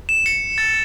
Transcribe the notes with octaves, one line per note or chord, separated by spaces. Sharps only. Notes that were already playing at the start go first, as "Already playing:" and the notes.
E7
C#7
A6